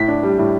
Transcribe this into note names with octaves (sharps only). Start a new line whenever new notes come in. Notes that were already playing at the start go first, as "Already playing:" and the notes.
Already playing: A2 B6
D4
G3
A2